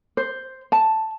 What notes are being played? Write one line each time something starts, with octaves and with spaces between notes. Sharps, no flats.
C5
A5